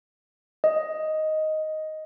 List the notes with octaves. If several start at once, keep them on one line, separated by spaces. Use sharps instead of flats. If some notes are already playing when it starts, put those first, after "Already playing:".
D#5